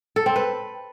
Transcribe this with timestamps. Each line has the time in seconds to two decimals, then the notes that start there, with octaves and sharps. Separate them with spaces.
0.16 A4
0.26 C4
0.36 B4